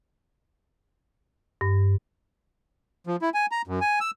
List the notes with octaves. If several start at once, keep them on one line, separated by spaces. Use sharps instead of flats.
G2
F3
E4
G#5
A#5
F#2
G#5
E6